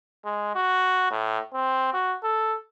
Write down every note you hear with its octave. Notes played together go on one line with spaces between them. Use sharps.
G#3
F#4
A2
C4
F#4
A4